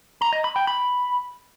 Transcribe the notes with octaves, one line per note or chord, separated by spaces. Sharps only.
A#5
D#5
B5
G5
B5